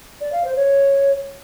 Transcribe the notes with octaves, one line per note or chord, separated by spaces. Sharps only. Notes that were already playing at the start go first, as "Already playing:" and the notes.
D5
F5
C5
C#5